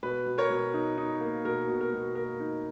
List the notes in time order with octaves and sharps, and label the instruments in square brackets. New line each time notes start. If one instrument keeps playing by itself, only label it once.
[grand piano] B2 B4
B2
A#4 C#5
B2
D#4
D#4
A#3
B2 A#4
B2
A#4
B2
A#3 A#4
D#4